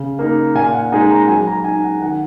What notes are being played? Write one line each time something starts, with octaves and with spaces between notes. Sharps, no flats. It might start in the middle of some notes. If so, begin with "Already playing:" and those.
Already playing: C#3
A#3 D#4
A#2 G#5
F#5
G#3 D#4 G#5
A#5
F#3 G#5
A#5
D#4 G#5
F#5
D#3 F#5